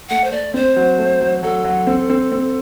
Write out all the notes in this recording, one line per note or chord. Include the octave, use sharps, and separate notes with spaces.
A3 F#5
C5
A3 D5
C4 C5
F#3
A3
F#3
F#3 A4
F#3
C4
C4
C4